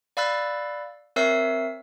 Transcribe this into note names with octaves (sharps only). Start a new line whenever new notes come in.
D5 F5 B5 E6 F#6 A6
C4 A#4 C#5 E5 E6 C7